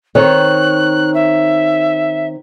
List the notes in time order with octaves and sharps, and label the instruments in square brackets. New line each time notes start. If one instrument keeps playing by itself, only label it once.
[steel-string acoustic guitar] D#3 C4 C#5 [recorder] F#6
[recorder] E5